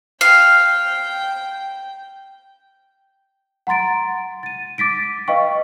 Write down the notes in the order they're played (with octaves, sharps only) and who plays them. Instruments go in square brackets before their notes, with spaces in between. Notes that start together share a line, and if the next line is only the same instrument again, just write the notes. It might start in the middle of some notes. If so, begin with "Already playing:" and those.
[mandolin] F5 [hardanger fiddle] G5
[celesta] F#5 A#5 C6 A6 D7
A6 D#7
D6 A6 B6 D7
B4 D#5 F5 G5 C#6